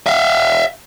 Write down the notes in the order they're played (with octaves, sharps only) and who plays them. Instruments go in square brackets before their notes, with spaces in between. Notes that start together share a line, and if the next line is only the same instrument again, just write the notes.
[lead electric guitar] E5 F5